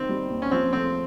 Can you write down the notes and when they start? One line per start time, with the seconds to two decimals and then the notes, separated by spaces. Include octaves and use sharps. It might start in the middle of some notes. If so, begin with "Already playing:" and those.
Already playing: D#3 C4
0.09 G3
0.30 D#2
0.42 C#4
0.51 F3 C4
0.73 A3 C4